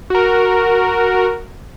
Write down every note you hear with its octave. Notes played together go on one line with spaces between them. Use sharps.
F#4 A#4